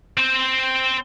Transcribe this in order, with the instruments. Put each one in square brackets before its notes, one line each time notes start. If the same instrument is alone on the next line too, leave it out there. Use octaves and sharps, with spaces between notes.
[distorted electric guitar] C4 C5